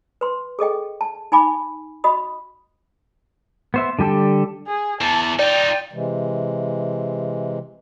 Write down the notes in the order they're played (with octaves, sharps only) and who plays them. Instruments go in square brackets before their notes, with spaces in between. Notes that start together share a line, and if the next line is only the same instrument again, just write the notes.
[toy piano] B4 C6
G#4 A4 D#5 G5
A5
D#4 G#5 B5 D6
F#4 D#5 B5 D#6
[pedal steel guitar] B3 C5 E5
D3 G3 G4 A4
[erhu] G#4
[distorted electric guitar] E2 [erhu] A5
[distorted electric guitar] D#4 F4 [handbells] D5 [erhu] G5
[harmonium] C3 E3 G#3